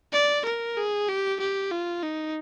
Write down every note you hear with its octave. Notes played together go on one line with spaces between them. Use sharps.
D5
A#4
G#4
G4
G4
F4
D#4